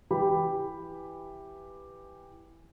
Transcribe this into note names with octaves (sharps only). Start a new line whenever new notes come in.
E3 G4 B5